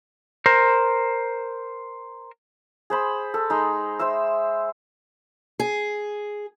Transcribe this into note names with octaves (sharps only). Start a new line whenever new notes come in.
A#4 C5
G#4 C5 B5
A4
G#3 D#4
C5 E5 C6 E6
G#4